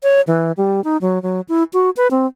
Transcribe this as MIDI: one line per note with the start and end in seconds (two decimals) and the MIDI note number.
0.03 0.21 73
0.27 0.52 52
0.57 0.83 55
0.84 0.97 63
1.01 1.21 54
1.23 1.41 54
1.49 1.63 64
1.73 1.90 66
1.97 2.08 71
2.11 2.26 60